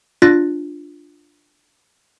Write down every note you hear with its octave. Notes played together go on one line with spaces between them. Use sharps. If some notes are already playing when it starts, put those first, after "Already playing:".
D4 F4 F#6 A6 A#6